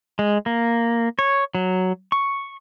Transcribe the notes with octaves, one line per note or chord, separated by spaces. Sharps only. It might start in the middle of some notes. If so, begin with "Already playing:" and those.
G#3
A#3
C#5
F#3
C#6